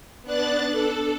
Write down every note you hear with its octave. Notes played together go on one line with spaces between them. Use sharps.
B3 D4 F#6 A6
A4